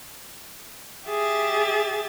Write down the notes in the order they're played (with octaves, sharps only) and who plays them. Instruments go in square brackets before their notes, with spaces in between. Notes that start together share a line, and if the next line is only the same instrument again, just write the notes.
[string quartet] G4 G#4 E5 A6